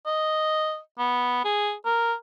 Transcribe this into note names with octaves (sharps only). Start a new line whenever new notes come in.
D#5
B3
G#4
A#4